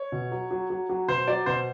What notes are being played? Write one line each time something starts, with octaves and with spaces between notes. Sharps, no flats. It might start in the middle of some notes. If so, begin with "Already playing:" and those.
Already playing: C#5
B2
F#3
F#3
F#3
F#3
B2 C5
F#3 D5
B2 C5